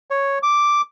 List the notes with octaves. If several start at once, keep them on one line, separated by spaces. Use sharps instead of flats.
C#5
D6